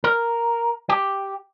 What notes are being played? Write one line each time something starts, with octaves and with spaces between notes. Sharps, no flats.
A#4
G4